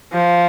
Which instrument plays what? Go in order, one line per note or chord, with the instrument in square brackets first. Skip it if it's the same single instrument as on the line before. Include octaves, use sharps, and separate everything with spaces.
[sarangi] F3